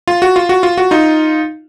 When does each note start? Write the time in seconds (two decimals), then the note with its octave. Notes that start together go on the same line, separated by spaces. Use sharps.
0.07 F4
0.22 F#4
0.36 F4
0.49 F#4
0.63 F4
0.78 F#4
0.91 D#4 F4